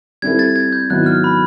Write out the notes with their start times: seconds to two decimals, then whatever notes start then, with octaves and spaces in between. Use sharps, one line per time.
0.22 G3 C4 E4 A4 G#6
0.39 A6
0.56 G#6
0.73 G6
0.90 G#2 D#3 F#3 B3 E4 F#6
1.06 F6
1.24 B5